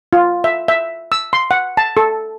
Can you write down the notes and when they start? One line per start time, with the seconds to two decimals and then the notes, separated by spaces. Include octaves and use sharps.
0.13 F4
0.44 E5
0.68 E5
1.12 E6
1.33 C6
1.51 F#5
1.77 A5
1.97 A4